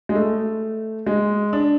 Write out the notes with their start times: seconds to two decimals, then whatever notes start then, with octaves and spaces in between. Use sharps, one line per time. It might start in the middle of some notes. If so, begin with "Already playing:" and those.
0.09 G#3
0.15 A3
1.06 G#3
1.53 D4